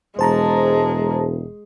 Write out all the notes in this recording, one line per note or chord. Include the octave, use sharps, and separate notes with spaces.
E1 G#3 C5 A5 A#5